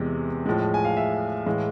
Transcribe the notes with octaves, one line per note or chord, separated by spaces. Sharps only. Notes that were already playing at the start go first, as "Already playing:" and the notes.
Already playing: E2 C3 E3 G#3
A2 F3 G#3
G#5
F5
E5
A2 E3 G#3 F5